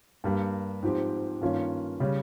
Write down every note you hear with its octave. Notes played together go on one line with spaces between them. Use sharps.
G2 G3 A#3
G#2 F3 C4 G4
G2 D#3 A#3 C#4 F4
C#3 G3 C#4